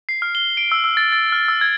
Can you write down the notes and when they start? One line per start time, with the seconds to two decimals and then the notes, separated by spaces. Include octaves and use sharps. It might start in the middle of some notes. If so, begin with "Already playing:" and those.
0.09 C7
0.22 F6
0.35 G7
0.57 D7
0.72 E6
0.84 E6
0.97 A6
1.12 A6
1.32 F6
1.48 E6
1.61 G#6